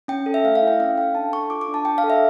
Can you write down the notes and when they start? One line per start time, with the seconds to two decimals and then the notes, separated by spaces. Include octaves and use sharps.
0.08 C#4 G5
0.26 A4
0.34 E5
0.44 A3 F5
0.55 F5
0.62 E4
0.67 G5
0.80 C#4 F5
0.98 A4 G5
1.15 D4 A5
1.32 A4 C#6
1.50 F4 D6
1.61 D6
1.68 D4
1.74 A5
1.85 D4 G5
1.98 F5
2.04 A4
2.10 E5